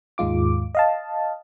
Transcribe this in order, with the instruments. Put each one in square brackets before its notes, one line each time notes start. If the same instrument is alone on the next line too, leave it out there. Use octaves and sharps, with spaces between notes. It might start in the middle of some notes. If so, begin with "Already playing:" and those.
[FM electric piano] D#2 G#2 G#3 F4 D6
D#5 F5 A5